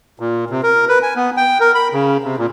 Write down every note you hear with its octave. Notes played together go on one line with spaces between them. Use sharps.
A#2
C3
A#4
B4
G#5
B3
G5
A#4
B5
C#3
C3
A#2